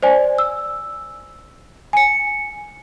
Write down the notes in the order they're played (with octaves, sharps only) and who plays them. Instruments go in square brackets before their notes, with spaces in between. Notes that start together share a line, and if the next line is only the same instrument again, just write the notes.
[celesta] C5 D5 G#5
E6
G#5 C#7